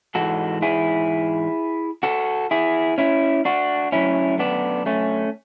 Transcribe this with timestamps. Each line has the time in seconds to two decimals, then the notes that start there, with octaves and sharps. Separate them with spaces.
0.15 G#2 E3 G#3 F#4 A4
0.62 E4 G#4
2.03 F#4 A4
2.51 E4 G#4
2.98 C#4 E4
3.45 D4 F#4
3.92 F#2 D3 F#3 A3 C#4 E4
4.39 B3 D4
4.86 A3 C#4